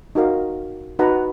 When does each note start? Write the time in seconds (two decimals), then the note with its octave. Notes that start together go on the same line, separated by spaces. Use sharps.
0.15 D#4 F#4 A#4 F5
0.99 D#4 F#4 B4 F#5 A#5